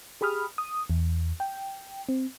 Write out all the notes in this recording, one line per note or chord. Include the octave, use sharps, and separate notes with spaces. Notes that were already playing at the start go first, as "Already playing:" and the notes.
G4 G#4 B5 D#6 F6
D#6
E2
G5
C4